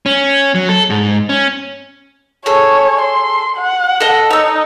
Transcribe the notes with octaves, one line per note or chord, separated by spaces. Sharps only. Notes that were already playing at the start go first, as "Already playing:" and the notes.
C#4
F#3
A4
G#2
C#4
G#4 A4 C#5
C6
F#5
A4 D#5
D#4 C#5 E6